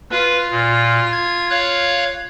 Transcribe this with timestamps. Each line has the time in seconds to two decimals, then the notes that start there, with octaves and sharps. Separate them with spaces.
0.11 F4 B4
0.50 A#2
1.12 G#6
1.50 C#5 F5 F#6